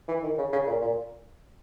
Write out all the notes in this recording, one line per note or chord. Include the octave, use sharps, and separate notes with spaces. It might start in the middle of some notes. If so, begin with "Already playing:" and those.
E3
D#3
C#3
C#3
A#2
A#2